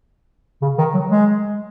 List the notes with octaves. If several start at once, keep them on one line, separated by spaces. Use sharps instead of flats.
C#3
D#3
F#3
G#3